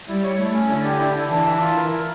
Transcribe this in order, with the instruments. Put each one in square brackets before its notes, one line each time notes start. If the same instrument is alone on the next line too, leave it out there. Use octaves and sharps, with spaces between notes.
[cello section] G3 [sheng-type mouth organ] E4
[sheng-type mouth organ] C#5
[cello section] A3 [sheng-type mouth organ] E4
[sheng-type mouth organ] C#4
[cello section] D3 [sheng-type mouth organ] E4
[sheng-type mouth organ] G4
E4
E4
[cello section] E3 [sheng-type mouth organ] D4
[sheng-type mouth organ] E5
F4
A#4
E4